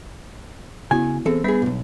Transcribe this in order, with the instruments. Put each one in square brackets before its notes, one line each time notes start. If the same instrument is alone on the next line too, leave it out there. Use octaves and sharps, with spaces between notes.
[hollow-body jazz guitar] C#3 G#5 [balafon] B3 E4 F#4
[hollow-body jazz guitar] E3 C4 A4 [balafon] B3 G#4 C5
[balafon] G3 D4 [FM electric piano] B3 [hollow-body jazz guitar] G#4 B5
[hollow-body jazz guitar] B1 A#2